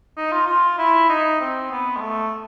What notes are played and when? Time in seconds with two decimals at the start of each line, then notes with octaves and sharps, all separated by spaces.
0.17 D#4
0.32 F4
0.47 F4
0.78 E4
1.09 D#4
1.40 C4
1.71 B3
1.97 G#3
2.01 A3